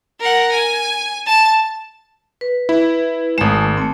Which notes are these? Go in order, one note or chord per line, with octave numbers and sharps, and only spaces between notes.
A#4 F#5
G#5
A5
B4
E4
G#1 G#3 A3 D#6 E7
A3 C4